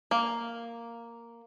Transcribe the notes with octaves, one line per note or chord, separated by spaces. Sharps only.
A#3